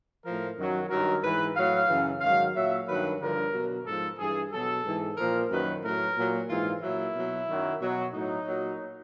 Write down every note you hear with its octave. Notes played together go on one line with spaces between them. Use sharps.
A2 F3 A#4
F#2 D#3 F#3
G2 D#3 F#3 A#4
G#2 E3 B4
A2 F#3 F5
F#2 C#3 E3
G#2 D#3 F#3 F5
A#2 F#3 E5
G2 D#3 F#3 B4
G2 D3 F3 A#4
B2 F#3
G#2 F3 A4
G2 E3 G#4
B2 F#3 A4
G#2 E3
A#2 F3 A#4
F#2 D#3 F#3 B4
A2 F#3 A#4
A#2 F#3
G#2 E3 F4
A#2 F#3 E4
B2 F#3
F#2 D#3 F#3
B2 F#3
A2 F#3 D#4
A#2 F#3